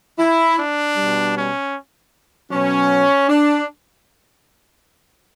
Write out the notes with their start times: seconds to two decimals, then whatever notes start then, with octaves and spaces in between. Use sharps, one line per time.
0.19 E4
0.57 D4
0.97 B2 G3
1.35 C#4
2.51 B2 F#3 C#4
3.29 D4